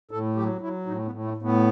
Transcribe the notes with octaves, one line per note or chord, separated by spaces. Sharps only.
A2 A4
F#3 G4
F#3 E4
A2 D#4
B3
A2
A3
A2
B3